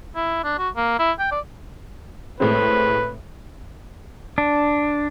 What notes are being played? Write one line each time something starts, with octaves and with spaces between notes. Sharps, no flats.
E4
D4
F#4
A#3
E4
G5
D5
A2 G#3 C4 B4
D4